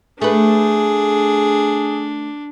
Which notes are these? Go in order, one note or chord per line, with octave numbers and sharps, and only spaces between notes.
A3 D4 G#4 B4